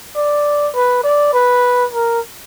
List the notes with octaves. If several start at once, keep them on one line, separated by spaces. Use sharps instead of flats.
D5
B4
D5
B4
A#4